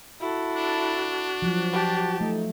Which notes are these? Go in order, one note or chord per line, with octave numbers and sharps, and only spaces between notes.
E4 F#4 A4
D4
F3 F#3
G4 A5
A3 D#4